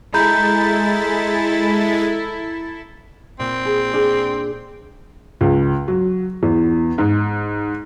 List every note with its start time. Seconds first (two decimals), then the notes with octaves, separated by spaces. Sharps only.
0.14 G#3 E4 A4 A#5 B5 G6 A6
3.39 A#2 C4
3.65 G#4
3.93 D4 G#4
5.41 C#2
5.88 F#3
6.43 E2
6.98 G#2